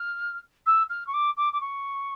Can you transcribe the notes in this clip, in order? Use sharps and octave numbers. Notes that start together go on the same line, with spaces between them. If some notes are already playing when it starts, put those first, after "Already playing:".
Already playing: F6
E6
F6
C#6
D6
D6
D6
C#6